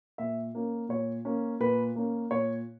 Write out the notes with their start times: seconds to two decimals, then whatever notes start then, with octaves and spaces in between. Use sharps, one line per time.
0.18 A#2 E5
0.55 A#3 C#4
0.89 A#2 C#5
1.25 A#3 C#4
1.60 A#2 B4
1.96 A#3 C#4
2.31 A#2 C#5